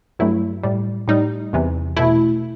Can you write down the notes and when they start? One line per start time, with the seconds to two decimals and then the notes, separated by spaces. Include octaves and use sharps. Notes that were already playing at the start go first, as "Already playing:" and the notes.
0.19 G2 F#3 A3 E4
0.63 A2 G3
1.08 A2 G3 D#4
1.53 E2 C3 E3
1.97 B2 A3 E4